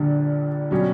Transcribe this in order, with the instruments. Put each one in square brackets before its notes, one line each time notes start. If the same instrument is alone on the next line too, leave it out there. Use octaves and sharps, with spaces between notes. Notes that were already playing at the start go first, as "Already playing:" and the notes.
Already playing: [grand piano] A#1 A#2 G3 [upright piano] D3
[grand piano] B2 G3 C#4 G4 [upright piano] F#3